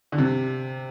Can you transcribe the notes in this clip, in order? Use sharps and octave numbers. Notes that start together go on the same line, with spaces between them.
D3
C3